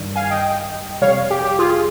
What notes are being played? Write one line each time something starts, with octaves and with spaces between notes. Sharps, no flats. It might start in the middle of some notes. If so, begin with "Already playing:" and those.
Already playing: G2 D#3 G3
F5 G#5
D#5 G5
F2 C3 G3 C#5 F5
G4
G4
F4 G#4